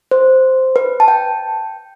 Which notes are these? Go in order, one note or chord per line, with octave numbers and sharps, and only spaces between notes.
C5
B4
A5
G5